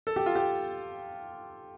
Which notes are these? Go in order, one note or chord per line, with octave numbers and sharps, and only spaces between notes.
A4
G4
F4
G4